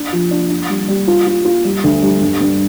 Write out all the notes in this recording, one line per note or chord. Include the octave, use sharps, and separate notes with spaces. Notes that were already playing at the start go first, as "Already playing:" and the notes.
Already playing: D4
F3
D4
D4
G3
G3
F4
F4
F4
G3
D2
G3
G2
G2